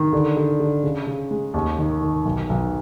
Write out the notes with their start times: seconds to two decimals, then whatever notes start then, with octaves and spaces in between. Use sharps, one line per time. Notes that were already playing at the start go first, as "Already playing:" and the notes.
Already playing: D#3
0.13 D3
0.37 D3
0.60 D3
0.84 C#3
1.07 C#3
1.31 G#3
1.54 D#2
1.78 D#3
2.01 D#3
2.25 B1
2.49 B1